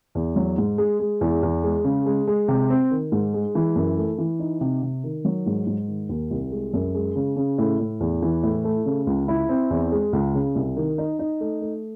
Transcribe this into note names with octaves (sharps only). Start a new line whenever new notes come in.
E2
F#3
G#2
G#3
G#3
E2
E2
G#3
C#3
G#3
G#3
C3
C4
D#3
G#2
G#3
E3
F#2
A3
E3
D#4
C3
C3
D#3
F#3
G#2
G#2
D#3
D#2
C2
G#3
F#2
G#3
C#3
C#3
A2
A2
E2
E3
A2
A3
C#3
C#2
E4
C4
E2
G#3
C#2
C#3
C2
D#3
D#4
D#4
A3
A3